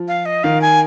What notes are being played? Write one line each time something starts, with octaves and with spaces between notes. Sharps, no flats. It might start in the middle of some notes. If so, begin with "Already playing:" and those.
Already playing: F3
F5
D#5
D#3 F5
G#5